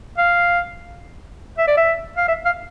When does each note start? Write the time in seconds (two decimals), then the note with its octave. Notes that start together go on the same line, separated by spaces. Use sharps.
0.18 F5
1.58 E5
1.68 D5
1.77 E5
2.17 F5
2.28 E5
2.45 F5